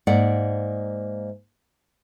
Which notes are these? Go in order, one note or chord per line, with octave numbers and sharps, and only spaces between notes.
G#2 A#3 D5 F#5